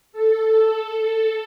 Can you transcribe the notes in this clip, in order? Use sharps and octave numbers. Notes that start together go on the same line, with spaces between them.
A4